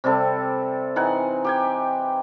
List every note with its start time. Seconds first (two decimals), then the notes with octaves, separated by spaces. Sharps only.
0.04 C3 G3 C4 A4
0.96 E3 D#4 F#5 G#5
1.44 G4 G5 G#5